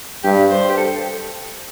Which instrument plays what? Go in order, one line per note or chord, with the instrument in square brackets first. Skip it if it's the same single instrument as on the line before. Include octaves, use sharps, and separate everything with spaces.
[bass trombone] G2 [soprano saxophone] G4
[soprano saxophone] C5
G4
A4